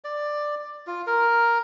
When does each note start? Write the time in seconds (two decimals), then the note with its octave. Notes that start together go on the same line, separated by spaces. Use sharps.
0.04 D5
0.87 F4
1.07 A#4